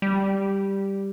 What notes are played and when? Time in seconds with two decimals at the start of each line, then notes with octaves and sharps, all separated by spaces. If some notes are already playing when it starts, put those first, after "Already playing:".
0.02 G3